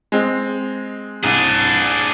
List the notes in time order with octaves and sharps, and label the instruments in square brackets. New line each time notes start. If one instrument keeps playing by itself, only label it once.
[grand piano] G#3 C4
[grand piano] C2 [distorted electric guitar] D4 G#4